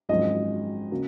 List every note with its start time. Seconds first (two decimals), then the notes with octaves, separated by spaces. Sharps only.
0.09 G#1 F#2 F3 G#3 D#5
0.92 C#3 F#3 A#3